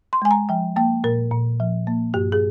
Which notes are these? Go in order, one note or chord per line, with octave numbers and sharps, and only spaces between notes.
C6
G#3 G#5
A#5
F3 G5
A#3 G5
A#2 A#4
A#2
F3
A#3
G2 G4
G#4